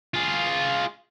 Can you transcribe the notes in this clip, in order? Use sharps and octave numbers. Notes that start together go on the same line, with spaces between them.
F4 G#4